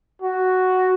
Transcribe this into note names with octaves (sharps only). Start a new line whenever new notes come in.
F#4